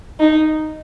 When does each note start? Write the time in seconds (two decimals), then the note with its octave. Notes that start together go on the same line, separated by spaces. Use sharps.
0.20 D#4